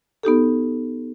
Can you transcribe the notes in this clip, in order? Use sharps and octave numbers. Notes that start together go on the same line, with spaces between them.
B3 D#4 G4 A4